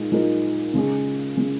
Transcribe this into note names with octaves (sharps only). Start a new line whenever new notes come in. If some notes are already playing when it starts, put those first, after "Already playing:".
Already playing: A#2 G#3 D#4 A#4
A#2 G#3 D#4 A#4
C#3 G#3 C#4 G#4
C#3 G#3 C#4 G#4